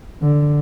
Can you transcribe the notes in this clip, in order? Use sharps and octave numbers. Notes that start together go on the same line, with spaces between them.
D3